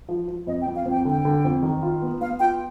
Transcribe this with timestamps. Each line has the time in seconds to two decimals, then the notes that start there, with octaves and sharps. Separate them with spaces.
0.09 F3
0.28 F3
0.47 F2 D#5
0.61 G5
0.66 F2
0.76 F5
0.85 F2
0.91 G5
1.05 D3
1.10 G5
1.25 D3
1.44 F2
1.62 D#3
1.83 F4
2.02 B3
2.21 B3 F5
2.40 F4 G5